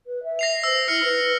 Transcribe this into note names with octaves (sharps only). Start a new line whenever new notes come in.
B4
E5
A#6 C7 F7
C5 E6
E4 F6 C#7
B4